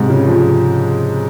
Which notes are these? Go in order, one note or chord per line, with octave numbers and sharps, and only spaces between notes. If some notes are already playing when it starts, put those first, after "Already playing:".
Already playing: G#2 C3
C#3
F3